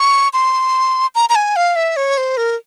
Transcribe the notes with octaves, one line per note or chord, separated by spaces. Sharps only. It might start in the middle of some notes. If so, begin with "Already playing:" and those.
Already playing: C#6
C6
A#5
A#5
G#5
F5
E5
C#5
C5
A#4